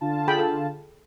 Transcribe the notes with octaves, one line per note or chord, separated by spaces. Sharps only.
D3 F4 A5
G#4 G5 B5
A4